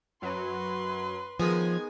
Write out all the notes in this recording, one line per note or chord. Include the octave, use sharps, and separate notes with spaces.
F#2 F#3 B4 C6
D#3 F3 G#3 B3 G#5